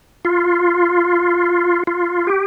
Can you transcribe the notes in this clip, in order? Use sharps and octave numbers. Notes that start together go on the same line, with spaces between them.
F4
F4
G4